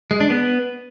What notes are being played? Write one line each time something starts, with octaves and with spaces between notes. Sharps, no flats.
G#3
D4
B3